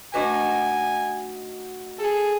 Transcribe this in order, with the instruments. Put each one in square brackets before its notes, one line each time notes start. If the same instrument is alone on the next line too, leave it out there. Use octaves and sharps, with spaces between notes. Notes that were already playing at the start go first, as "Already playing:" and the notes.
[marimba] A3 D4 B4 [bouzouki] D#4 F#4 [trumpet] G#5
[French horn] G#4 [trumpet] A4